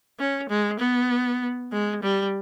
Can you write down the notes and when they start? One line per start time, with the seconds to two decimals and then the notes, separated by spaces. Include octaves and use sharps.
0.19 C#4
0.49 G#3
0.80 B3
1.72 G#3
2.03 G3